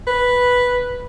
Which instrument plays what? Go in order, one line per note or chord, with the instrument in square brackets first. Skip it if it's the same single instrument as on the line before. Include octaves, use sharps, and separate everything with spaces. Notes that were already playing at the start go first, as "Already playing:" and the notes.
[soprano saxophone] B4